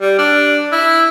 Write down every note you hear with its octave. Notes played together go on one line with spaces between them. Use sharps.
G3
D4
E4